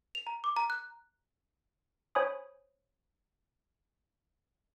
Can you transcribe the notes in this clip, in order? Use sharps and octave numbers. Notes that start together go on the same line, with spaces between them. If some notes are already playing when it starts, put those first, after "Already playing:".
F7
A#5
D6
A#5
F#6
C5 C#5 G#5 B5 D#6